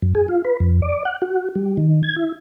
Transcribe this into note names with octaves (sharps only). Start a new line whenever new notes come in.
F#2
G#4
F4
B4
F2
D5
F#5
F#4
G3
D#3
G#6
E4